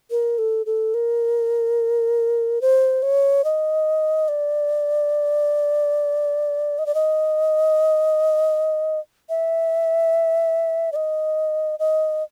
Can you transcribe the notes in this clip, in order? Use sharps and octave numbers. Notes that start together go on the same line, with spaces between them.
A#4
A4
A4
A#4
C5
C#5
D#5
D5
D#5
D5
D#5
E5
D5
D#5
D#5